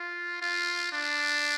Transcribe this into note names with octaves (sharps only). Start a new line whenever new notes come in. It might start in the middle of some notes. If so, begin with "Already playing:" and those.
Already playing: F4
F4
D4